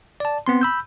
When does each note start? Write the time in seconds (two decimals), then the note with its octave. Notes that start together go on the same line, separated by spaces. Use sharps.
0.20 D5 A5
0.47 B3 C4 C6
0.61 B5 E6 G6